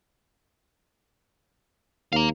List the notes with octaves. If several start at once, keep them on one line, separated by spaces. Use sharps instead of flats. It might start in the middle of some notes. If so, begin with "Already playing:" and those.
D#2 F5 A#5